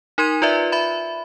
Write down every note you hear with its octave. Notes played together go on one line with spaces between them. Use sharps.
D#4 A#4 C6 G#6 D#7
F4 B4 D5 E5
E5 B5